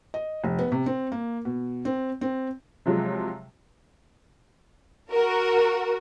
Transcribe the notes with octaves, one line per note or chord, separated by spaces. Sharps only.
D#5
F1
B3
C3
C4
A#3
B2
C4
C4
C3 F3 F#3 G#3
F#4 A#4